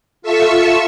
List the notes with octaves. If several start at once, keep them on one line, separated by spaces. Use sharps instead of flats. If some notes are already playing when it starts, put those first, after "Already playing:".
F4 A4 E5 C#6 E6